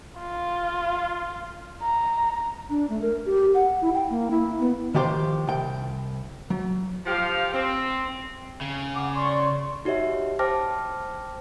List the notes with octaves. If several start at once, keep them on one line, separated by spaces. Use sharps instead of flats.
F4
A#5
D4
A3
A#4
G4
F#5
E4
G5
A#3
E4
B3
D#3 F3 G4 C5
C2 G5
F#3
F3 G4 F5
C4
C#3
F#5 D6
D5 C6 C#6
D#4 F#4 G4 C#5 E5
C5 G5 A5 D6 F6 A#6